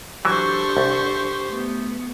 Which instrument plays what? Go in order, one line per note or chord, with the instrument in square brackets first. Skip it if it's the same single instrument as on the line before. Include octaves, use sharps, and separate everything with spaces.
[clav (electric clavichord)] E3 F#3 [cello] D4 A4 [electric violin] G4 C5 [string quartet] C#6
[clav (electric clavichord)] C2
[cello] A3 B3